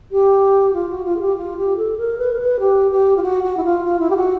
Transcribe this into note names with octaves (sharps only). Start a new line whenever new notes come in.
G4
F4
F#4
F4
G#4
G4
F4
G4
A4
A#4
B4
A#4
B4
G4
G4
F4
F#4
F#4
E4
F4
F4
E4
G4
F#4